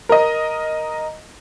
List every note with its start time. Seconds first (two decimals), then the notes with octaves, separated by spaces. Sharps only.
0.09 A#4 D#5